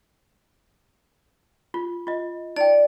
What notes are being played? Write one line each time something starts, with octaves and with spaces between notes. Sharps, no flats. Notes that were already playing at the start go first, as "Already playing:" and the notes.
F4
F4 D#5
D#4 D5 G5